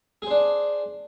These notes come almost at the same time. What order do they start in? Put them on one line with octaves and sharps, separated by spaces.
G#4 C5 D4